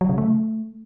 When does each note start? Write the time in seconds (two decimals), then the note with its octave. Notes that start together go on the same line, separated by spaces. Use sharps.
0.01 F#3
0.09 C#3
0.18 A3